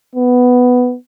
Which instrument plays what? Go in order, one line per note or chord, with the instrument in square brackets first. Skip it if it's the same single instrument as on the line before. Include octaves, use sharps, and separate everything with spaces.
[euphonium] B3